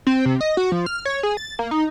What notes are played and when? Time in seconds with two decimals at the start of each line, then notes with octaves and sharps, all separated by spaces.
0.07 C4
0.25 C3
0.41 D#5
0.57 F#4
0.72 F3
0.86 F6
1.05 C#5
1.23 G#4
1.37 A6
1.59 A#3
1.71 D#4